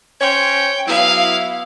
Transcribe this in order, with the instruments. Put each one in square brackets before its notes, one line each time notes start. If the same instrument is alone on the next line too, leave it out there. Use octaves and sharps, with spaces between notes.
[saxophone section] C#4 C5 C#5 [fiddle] G5
[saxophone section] F#3 B3 E4 [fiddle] F5